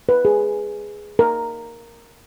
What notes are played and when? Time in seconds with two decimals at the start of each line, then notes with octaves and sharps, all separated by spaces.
0.09 B4
0.25 G#4
1.19 A#4